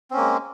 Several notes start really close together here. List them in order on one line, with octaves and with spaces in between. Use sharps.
C4 C#4 A#3 G#3